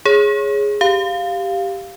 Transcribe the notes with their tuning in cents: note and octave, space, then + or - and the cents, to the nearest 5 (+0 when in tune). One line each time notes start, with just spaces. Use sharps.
G#4 +0 C#5 +0
G4 +0 F5 +0